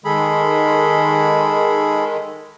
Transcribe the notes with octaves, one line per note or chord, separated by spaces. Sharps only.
D#3 G#3 G#4 A4 B5